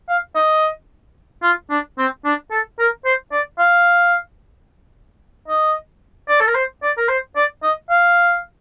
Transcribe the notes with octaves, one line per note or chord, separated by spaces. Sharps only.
F5
D#5
F4
D4
C4
D4
A4
A#4
C5
D5
F5
D#5
D5
A4
A#4
C5
D5
A#4
C5
D5
D#5
F5